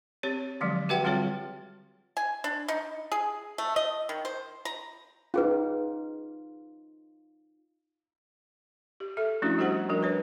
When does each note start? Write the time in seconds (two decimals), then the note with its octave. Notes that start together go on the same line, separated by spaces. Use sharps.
0.23 C4 G4 C#5
0.61 D3 F3 F#3 G#3
0.89 F#4 G4 B4 E5 F#5 G5
1.04 D3 G3 C4 F4 G#4 C#5
2.17 G#5
2.44 D4
2.68 D#4
3.12 G#4
3.58 A3
3.76 D#5
4.09 D#3
4.25 C5
4.65 A#5
5.34 C#4 D#4 F4 G#4 B4
9.00 G4
9.17 A4 E5
9.42 F3 A3 C#4 D4 E4 F#4
9.58 G3 F#4 G4 C5 F#5 A#5
9.89 F3 G3 D4 F#4 A#4
10.03 B4 C#5